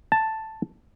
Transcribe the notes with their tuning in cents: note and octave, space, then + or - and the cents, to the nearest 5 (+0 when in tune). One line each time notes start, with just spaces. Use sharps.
A5 +0